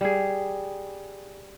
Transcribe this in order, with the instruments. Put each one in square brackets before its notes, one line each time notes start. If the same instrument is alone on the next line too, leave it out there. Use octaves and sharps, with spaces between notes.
[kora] G3 G#4